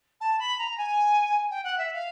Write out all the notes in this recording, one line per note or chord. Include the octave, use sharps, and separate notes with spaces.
A5
B5
A#5
G#5
G5
F#5
E5
F5